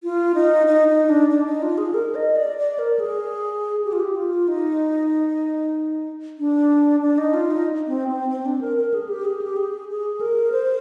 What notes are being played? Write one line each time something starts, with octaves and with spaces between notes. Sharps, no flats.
F4
D#4
D#4
D#4
D4
D4
D#4
F4
G#4
A#4
D#5
D5
D5
A#4
G#4
G4
F4
G4
F4
D#4
D4
D4
D#4
F4
D#4
C4
C4
C4
D4
A#4
A#4
G#4
G4
G#4
G4
G#4
G#4
A#4
C5